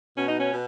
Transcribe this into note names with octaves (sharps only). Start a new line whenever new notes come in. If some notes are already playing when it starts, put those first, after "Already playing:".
B2 C#4
D#4
C#4
B2